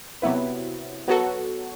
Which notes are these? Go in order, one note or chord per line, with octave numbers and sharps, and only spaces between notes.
C3 F#3 B3 E4 B4
F#3 B3 F#4 A4